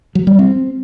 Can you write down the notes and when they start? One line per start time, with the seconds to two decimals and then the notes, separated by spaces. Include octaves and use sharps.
0.15 F#3
0.27 G3
0.39 C4